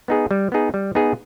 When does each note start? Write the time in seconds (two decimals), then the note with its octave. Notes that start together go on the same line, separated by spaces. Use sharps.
0.08 B3 D#4 G#4
0.31 G3
0.52 B3 D#4 G#4
0.74 G3
0.95 B3 D#4 G#4